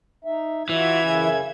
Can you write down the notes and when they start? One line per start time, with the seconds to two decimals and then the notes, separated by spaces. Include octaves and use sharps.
0.25 D#4 E5
0.69 E3 F4 F#4 E5 G#6
1.00 F#2 C#3 C#4